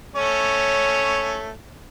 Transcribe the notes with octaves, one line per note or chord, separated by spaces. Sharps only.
A3 C#4 C#5